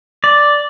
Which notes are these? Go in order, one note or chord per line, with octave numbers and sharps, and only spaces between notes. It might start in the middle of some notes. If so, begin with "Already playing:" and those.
D5